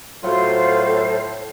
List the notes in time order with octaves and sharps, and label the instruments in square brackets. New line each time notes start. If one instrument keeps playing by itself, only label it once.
[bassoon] A2 [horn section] F#3 F4 [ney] A4 [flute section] C5